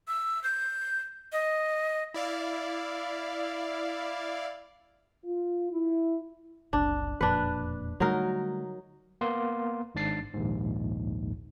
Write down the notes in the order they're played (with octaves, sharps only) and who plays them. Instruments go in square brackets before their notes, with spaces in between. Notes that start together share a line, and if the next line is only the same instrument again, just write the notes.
[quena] E6
G6
D#5
[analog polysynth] E4 D5 F5
[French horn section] F4
E4
[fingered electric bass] F#1 C2 C3 [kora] D4
[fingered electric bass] E1 F2 A#2 [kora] D4 B4
[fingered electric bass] D3 G3 A3 [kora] F#3 D#4 A#4
[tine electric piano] A#3 B3 C6
G#1 G#2 D4 A6 C7
A#1 D#2 G#2